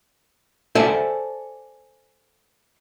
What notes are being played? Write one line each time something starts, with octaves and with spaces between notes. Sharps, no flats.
A4 C5 D5 E5 G#5 A5